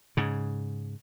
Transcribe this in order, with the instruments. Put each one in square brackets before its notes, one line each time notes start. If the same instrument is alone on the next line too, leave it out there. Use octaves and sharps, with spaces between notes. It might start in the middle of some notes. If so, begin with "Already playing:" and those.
[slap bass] G#2 C#3